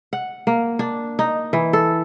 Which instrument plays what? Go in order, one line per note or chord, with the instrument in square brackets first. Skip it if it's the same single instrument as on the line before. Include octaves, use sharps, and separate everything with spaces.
[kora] F#5
A#3
D4
D#4
E3
A4